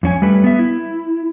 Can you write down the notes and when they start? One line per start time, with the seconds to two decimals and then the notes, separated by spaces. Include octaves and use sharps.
0.03 F2 C#4 G#5
0.22 G3 A3 B4
0.44 B3 E5
0.59 E4